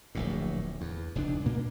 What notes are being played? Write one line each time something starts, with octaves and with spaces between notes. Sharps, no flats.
D1 A#1 A2
E2
F1 C#2 G#2 D4
A#2 A#3